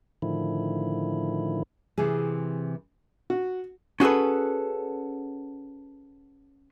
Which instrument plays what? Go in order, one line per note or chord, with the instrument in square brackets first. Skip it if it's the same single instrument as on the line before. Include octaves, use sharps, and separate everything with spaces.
[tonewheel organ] A2 D3 D#3 F3 E4
[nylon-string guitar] C3 E3 E4 G#4
[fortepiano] F#4
[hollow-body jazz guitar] C#4 F#4 G#4 A4 B4